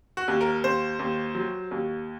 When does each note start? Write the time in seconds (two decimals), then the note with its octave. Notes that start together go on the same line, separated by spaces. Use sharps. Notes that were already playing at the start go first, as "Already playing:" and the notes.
0.17 F#4
0.28 D#2
0.41 A#4
0.64 D#2 C5
0.99 D#2
1.35 F#3
1.71 D#2